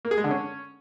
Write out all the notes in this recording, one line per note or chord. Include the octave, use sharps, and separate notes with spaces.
A#3
G#4
G#3
D3
C#4